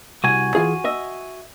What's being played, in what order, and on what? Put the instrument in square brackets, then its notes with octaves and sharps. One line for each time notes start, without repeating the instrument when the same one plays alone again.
[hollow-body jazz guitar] C2 [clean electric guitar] F#4 G#5
[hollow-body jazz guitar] E3 F4 G#4
D#5 E5